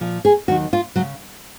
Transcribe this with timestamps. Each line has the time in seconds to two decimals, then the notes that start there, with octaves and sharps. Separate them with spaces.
0.01 A#2 F3
0.25 G#4
0.48 D#2 D#3 F#3 F#4
0.73 F4
0.96 C#3 F#3